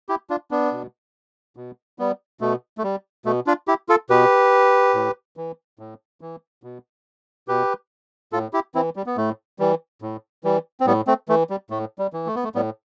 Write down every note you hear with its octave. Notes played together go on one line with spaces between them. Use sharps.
E4 G4
D4 F4
B3 D4
B2
B2
G3 B3
B2 A3
A3
G3
B2 A3
D4 F4
E4 G4
F4 A4
B2 G4 B4
A2
E3
A2
E3
B2
B2 G4 B4
A2 F4 A4
E4 G4
E3 C4 E4
G3
B3
A2 A3
E3 G3
A2
E3 G3
C4
A2 G3 B3
A3 C4
E3 A3
G3
A2 A3
G3
E3
A3
B3
A3
A2 G3 B3